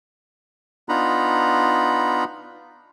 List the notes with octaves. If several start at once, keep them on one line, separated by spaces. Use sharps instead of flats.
B3 D4 D#4 F4 A#5 B5